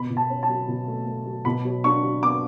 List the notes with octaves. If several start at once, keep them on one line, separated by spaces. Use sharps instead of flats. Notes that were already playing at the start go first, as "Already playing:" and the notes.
Already playing: B2 B5
B2
A5
C#4
A5
F#3
B2
A3
A3
F#3
B2 B5
F#3
D4 C#6
F#3
B3 D6